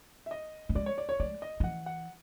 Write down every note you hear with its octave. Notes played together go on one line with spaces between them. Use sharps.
E5
D#5
G3
G#3 D5
C#5
D5
C#5
G#3 D5
D#5
F3
E3 F#5
F#5